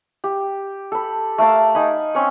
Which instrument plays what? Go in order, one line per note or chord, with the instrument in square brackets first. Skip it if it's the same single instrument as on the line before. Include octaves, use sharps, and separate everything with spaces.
[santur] G4
A4 B5
A3 A#4 F5 A5
D#4 G#5 B5
C4 C#4 C#6